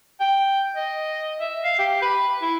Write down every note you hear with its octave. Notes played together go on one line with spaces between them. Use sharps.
G5
D#5
E5
F5
G4
B4
E4